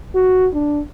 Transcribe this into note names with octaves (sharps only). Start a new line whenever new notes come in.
F#4
D4